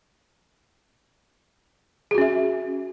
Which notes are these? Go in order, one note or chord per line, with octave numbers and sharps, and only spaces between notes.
C#4 F#4 G#4 E5